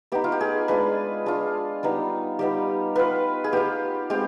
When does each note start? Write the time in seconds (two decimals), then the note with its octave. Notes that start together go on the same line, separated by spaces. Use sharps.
0.12 B3 D#4 G4
0.24 F4
0.32 G4
0.41 G#4
0.68 G#3 D4 F4 B4
1.26 G#3 D4 F4
1.83 G3 B3 D#4
2.39 G3 B3 D#4 G4
2.95 B3 F4 B4
3.44 G#4
3.53 B3 F4 G4
4.10 G#3 C4 G4